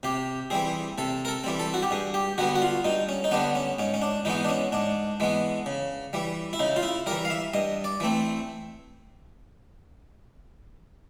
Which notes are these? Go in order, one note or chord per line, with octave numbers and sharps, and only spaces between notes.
C3 G4
E3 G3 C4 G#4
C3 A4
A#4
A4
E3 G3 C4
A4
F#4
G4
G2 G#4
G4
D3 G3 B3 F#4
F#4
F4
G2 D#4
C#4
D#4
D3 G3 B3 D4
C#4
G#2 C#4
C#4
D4
E3 G#3 B3 D#4
D4
C#4
G#2 D4
E3 G#3 B3
C#3
E3 G3
E4
C#3 D#4
F4
E4
E3 G3 A#4
F5
E5
G2 D#5
D5
E3 A3 C4